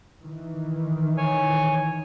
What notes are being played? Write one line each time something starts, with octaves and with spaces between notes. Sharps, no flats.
D#3 E3
C#5 G#5